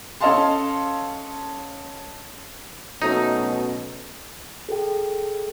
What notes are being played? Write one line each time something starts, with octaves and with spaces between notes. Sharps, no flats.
C#4 A4 D#5 F5 A5 C6
B2 F#3 A3 C#4 D#4
G#4 A4 G5